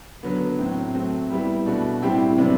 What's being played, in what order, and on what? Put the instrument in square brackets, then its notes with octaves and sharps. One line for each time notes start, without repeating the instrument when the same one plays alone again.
[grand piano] D3 F#3 B3
A2 F#3 C4
F#3 A3 C4
G3 B3 E4 G4
B2 A3 D4 F#4
A2 G3 C4 E4 G4
C3 F#3 B3 D4